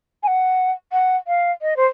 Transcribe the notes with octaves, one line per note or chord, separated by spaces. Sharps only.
G#5
F#5
F#5
F5
D#5
C5